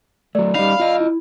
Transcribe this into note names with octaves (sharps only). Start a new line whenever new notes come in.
F#3 A3 D5
G3 D#4 F5 B5
F4 D#5
E4